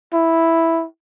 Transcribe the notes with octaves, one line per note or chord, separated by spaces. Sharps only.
E4